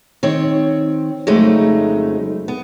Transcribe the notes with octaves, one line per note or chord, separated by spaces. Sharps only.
D#3 C4 C#5
F2 C#3 F#3 G#3 A3 D#4
B3